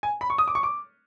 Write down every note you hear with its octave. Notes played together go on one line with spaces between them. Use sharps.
G#5
B5
C#6
D#6
D6
C#6
D6